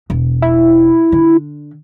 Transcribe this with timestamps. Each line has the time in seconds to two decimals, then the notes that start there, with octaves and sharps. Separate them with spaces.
0.10 E1
0.42 E4
1.12 D3